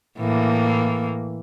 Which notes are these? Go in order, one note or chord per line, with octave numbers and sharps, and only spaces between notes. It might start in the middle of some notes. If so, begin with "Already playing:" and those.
A2 E3 A#3